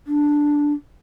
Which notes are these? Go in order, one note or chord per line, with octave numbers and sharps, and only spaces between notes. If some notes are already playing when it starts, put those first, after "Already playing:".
D4